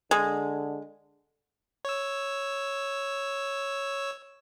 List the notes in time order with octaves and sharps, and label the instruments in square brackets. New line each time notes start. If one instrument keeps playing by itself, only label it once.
[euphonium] D3 [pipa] G#3
[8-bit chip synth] C#5 E6